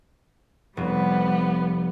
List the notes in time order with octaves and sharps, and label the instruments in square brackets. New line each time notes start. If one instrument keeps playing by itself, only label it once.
[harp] F1 [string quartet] G3 B3